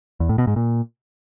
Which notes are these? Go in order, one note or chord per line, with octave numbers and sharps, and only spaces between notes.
E2
A2
B2
G#2
A#2